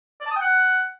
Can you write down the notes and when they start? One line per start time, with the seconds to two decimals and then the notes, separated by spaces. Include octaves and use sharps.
0.21 D5
0.26 A5
0.31 D#6
0.36 G5
0.41 F#5